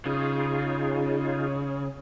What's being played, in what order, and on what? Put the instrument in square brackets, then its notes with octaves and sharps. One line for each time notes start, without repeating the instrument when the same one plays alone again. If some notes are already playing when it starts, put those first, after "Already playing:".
[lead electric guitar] C#3 [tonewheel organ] D#4 F4 G#4